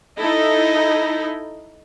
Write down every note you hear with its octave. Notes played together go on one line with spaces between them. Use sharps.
D#4 E4 A4 D#5